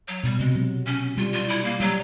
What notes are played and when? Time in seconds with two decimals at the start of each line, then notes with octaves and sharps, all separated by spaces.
0.08 F#3
0.24 B2 G3
0.39 C3 G#3
0.55 F#3
0.87 C#4
1.17 G3 F4
1.33 F4
1.49 E4
1.64 A#3
1.80 F#3 G3